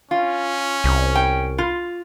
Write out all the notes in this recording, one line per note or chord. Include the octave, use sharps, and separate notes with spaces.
C#4 F4
C2
G5
F4